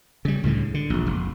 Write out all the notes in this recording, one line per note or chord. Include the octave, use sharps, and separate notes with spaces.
C#3 G3
C#2 A2 D3 G#3
D3
E1 A#1
F1